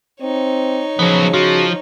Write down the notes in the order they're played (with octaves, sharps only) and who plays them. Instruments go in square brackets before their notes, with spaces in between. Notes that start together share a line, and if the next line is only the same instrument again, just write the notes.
[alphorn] C4 [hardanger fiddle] D#4 C#5
[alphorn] C#3 [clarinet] F3 [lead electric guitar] F#3 B3
[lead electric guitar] F3 [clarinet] F#4